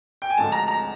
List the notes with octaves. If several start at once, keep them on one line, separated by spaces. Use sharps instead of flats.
G5
G#5
D2 D3 F3 G#3 A5
A#5
A#5